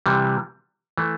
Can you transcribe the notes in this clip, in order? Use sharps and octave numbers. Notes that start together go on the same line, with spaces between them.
C3 E3 G3
E3 A3